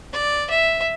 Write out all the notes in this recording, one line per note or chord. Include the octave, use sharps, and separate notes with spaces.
D5
E5